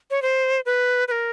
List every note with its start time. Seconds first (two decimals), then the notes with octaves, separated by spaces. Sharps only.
0.11 C#5
0.22 C5
0.66 B4
1.08 B4
1.11 A#4